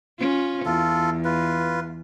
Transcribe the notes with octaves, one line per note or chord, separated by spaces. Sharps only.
C#4 F4
E2 F4 A4
F4 B4